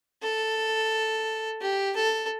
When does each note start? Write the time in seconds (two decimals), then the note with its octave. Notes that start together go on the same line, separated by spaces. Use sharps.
0.23 A4
1.61 G4
1.96 A4